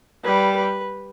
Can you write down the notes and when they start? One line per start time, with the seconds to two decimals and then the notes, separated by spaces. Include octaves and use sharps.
0.24 G3 B4
0.56 B4